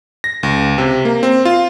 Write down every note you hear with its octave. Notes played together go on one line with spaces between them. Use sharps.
A#6
C#2
C3
A#3
C4
F4